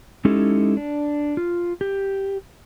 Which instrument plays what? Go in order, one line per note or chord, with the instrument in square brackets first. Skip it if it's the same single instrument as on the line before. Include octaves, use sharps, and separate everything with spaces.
[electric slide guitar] G#3 C#4 D#4 E4 G4 A4
D4
F4
G4